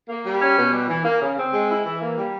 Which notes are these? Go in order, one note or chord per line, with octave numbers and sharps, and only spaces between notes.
A#3
G3
C#4
B2
G3
E3
A#3
C#3
C4
G#3
E4
E3
A#3
G3